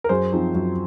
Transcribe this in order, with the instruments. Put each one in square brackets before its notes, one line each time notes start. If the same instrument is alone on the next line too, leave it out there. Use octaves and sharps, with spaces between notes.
[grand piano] A#4
F#2 G#4 C5
F3 C4 D#4
F#2